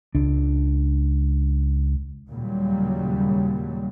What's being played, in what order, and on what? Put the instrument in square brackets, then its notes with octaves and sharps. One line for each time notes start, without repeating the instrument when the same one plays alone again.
[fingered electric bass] C#2 D4
[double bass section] D#2 A#2 C#3 F#3 G3